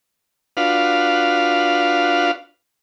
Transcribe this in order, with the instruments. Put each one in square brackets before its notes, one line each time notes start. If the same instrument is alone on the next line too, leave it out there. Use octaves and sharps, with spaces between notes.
[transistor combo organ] D4 F4 F#4 B4 F5